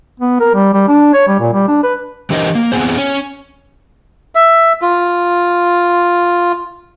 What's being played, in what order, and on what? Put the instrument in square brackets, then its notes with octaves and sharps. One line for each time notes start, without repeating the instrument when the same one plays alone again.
[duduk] B3
A#4
G3
G3
D4
C#5
G3
A#2
G3
D4
B4
[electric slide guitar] E3 D4 G4 A#4 C5 D#5
A#3
E2 E3 B3 C4 G#4 C5
C#4
[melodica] E5
F4